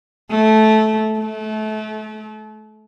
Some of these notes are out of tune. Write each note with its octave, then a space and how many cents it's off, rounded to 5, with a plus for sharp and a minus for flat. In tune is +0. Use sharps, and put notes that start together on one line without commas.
A3 -15
A3 -30